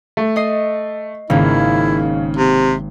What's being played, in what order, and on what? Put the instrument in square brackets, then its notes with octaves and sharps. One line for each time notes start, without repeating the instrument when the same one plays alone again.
[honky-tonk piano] A3
[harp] D#5 D#6 C7
[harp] G#1 A#3 [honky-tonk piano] C#3 [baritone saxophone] E4
[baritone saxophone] C3